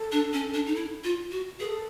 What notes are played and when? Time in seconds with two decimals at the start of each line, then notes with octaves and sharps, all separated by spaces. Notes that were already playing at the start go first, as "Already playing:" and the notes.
Already playing: A4
0.12 D4
0.33 C#4
0.54 D4
0.66 D#4
0.76 E4
1.04 F4
1.31 F#4
1.60 G#4 B4
1.65 A4